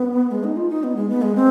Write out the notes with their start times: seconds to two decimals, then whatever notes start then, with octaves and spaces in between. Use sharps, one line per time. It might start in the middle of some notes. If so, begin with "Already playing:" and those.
Already playing: B3
0.31 G#3
0.44 D#4
0.56 F4
0.70 D#4
0.83 B3
0.96 G#3
1.09 B3
1.22 G#3
1.35 C4